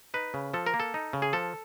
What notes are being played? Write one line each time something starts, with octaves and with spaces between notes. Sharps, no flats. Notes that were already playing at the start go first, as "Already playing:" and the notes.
D#4 B4
C#3
F3 A4
A#4
A#3
A4
D#4
C#3
G#4
F3 A4